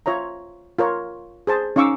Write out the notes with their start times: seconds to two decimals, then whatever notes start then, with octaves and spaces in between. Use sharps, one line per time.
0.06 F4 C#5 E5 A#5
0.79 F4 A#4 C#5
1.47 G#4 C5 A5
1.76 C#4 D#4 F5 C#6 D6 E6